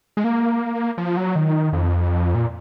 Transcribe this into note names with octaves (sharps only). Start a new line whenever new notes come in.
G#3
A#3
F3
F#3
D#3
F2
A#2